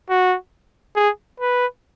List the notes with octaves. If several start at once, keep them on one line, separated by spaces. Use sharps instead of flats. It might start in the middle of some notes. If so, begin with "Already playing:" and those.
F#4
G#4
B4